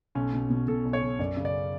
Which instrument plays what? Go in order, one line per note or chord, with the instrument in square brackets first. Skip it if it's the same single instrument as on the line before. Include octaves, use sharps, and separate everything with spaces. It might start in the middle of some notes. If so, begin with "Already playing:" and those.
[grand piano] B1 C#4
B2
B2
B2 A4
B1
C#5
B1
F#2 D5
C#3
D5